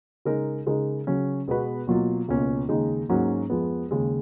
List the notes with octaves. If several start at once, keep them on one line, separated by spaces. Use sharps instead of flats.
C#3 G#3 D#4 A#4
C#3 G#3 D#4 A#4
C#3 F#3 C#4
B2 G#3 B3 F#4 B4
B2 F#3 A#3 F4
C#2 B2 A#3 C#4
D#2 C#3 G#3 D#4
G#2 F#3 A#3 C#4 F#4
F2 F3 G#3 B3
D#2 C#3 G#3